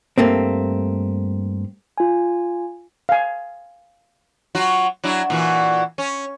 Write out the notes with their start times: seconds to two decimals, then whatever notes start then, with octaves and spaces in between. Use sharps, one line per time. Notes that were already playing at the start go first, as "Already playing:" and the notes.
0.18 G2 A3 A#3 C4
1.98 F4 G#5
3.09 F5 G#5
4.55 F#3 F4 F#4
5.04 F#3 D4 E4
5.30 A#2 E3 F#4
5.98 C#4